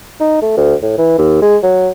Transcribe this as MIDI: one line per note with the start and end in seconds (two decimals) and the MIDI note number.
0.20 0.39 63
0.42 0.53 57
0.57 0.74 38
0.82 0.97 45
0.98 1.16 52
1.18 1.41 39
1.42 1.57 56
1.63 1.90 54